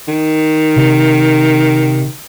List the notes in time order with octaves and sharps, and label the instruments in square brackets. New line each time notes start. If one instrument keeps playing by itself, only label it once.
[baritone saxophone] D#3
[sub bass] C3